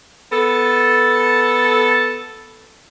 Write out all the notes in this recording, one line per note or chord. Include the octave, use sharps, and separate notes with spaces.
B3 A4